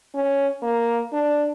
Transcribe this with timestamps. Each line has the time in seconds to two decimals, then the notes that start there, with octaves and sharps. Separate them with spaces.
0.14 C#4
0.62 A#3
1.13 D4